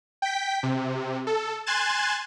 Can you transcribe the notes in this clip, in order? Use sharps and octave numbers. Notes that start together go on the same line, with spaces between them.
G5 B6
C3
A4
G#5 C6 F#6 G#6 A6 E7